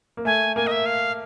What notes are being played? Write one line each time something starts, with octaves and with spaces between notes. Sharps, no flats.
A#3
A3 G#5
A#3 G#5
D#5
E5
F5